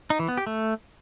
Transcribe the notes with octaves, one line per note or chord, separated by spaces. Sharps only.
D#4
E3
B3
G4
A3